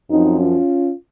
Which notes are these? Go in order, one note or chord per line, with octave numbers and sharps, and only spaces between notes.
F#2 F3 C4 D#4
C#4 F4